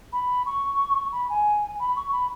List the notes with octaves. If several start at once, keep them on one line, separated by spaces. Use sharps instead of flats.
B5
C#6
B5
G#5
B5
C#6
B5